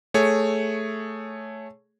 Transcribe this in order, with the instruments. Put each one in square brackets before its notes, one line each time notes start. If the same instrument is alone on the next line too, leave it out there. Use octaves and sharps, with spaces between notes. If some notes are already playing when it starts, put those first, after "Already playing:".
[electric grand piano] A3 G#4 C#5